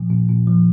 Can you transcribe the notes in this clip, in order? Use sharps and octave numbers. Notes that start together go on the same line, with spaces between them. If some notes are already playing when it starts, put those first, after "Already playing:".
Already playing: A#2 F3
A#2
A#2
F3